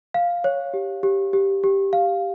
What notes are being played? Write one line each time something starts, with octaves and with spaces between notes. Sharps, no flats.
F5
C#5
G4
G4
G4
G4
F5